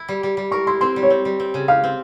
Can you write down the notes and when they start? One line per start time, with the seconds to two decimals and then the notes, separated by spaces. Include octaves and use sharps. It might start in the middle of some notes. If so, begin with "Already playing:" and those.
Already playing: E4
0.08 G3
0.23 G3
0.37 G3
0.52 A#4 C#6
0.67 E4 C6
0.81 C4 C6
0.96 G3
1.03 C#5
1.10 C4
1.25 G3
1.40 C4
1.54 C#3
1.68 G4 F5
1.84 C4